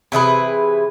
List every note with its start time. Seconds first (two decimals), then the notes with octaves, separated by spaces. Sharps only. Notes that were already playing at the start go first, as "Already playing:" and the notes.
0.12 C3 E3 G#4 B4